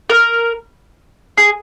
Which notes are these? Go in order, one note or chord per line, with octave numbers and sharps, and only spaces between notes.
A#4
G#4